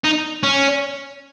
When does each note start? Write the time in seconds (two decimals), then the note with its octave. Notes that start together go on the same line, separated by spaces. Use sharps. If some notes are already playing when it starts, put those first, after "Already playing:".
0.04 D#4
0.43 C#4